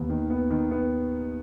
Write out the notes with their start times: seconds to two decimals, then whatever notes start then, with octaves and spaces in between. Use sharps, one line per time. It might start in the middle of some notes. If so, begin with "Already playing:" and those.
Already playing: D#2 B3
0.10 D#3
0.30 B3
0.51 D#3
0.71 B3